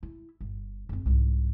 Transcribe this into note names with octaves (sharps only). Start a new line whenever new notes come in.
E4
G1
F#1 C4
C2 G#2